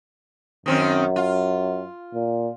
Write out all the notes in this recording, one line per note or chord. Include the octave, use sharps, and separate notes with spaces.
F#2 D#3 C4 C#4
F4
A#2